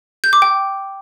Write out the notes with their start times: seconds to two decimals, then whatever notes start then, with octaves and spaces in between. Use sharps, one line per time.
0.24 G6
0.33 D6
0.42 G5